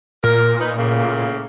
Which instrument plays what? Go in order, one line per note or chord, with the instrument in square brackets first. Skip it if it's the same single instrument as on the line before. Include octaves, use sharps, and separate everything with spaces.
[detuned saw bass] A#2 [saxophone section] A#4
[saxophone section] D#4 B4
A2 C#3 A#3